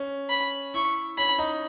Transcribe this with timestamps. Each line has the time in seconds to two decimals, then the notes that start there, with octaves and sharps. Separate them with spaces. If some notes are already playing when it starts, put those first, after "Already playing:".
Already playing: C#4
0.30 B5
0.74 E4 C#6
1.18 C#4 B5
1.39 D#4